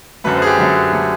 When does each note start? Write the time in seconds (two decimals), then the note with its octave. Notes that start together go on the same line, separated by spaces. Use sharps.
0.24 F#2 D3 F#3 A3 B4
0.36 C5
0.42 G#4
0.47 G4
0.58 F#2 D3 F#3 A3
0.93 D3 F#3 A3